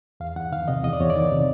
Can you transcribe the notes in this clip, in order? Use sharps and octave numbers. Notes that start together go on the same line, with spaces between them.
E2 F5
E2 F#5
D#3 F5
C3 D#5
E2 D#5
D5
E2 C#5
D5
D#3
C3